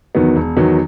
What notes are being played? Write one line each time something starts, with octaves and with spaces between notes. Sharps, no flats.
E2 D#3 F#3 B3
E1
E2 D#3 F#3 B3